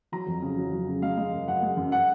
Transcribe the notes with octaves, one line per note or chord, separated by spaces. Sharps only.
F#3 A#5
F2
C#3
F#3
F#3
C#3
G#3 F5
G#3
F#2
F#2 F#5
G#3
F#2
F#5